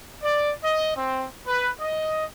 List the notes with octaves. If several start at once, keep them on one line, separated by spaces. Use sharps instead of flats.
D5
D#5
C4
B4
D#5